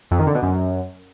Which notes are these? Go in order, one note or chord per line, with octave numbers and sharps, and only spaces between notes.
F2
D#3
D3
B2
F#2